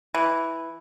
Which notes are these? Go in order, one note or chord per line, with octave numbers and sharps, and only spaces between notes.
E3